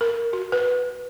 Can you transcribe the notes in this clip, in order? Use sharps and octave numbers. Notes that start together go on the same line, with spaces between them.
A#4
F#4
B4